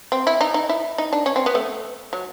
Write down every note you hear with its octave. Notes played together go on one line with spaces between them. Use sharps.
C4
E4
D#4
D#4
E4
D#4
D4
C#4
C4
B3
A3
F#3